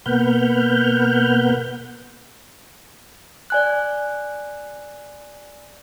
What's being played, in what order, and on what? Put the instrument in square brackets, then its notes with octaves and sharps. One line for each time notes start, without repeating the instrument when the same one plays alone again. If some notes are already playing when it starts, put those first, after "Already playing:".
[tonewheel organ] B2 A#3 B4 F#5 F6 G6
[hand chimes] D5 G#5 F#6